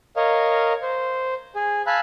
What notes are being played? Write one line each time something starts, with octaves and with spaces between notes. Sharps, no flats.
A#4 C#5 D#5 F5
C5
G#4
F5 G#5 A5 B5 E6 F#6